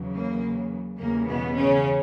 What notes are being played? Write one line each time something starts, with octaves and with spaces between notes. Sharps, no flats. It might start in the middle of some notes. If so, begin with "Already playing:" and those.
Already playing: E2 C#3 F#3
A#3
E2 C#3 E3 G3 A#3
B2 B3
C#3 C#4